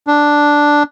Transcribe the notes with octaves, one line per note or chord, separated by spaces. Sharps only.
D4